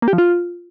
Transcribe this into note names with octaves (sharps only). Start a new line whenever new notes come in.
A#3
G4
F3
F4